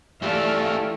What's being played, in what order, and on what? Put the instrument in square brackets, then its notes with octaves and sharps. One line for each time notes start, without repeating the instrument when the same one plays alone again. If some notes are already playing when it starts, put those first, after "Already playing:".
[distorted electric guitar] E3 G4 [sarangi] A3 [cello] D5 E5 [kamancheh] F5 F6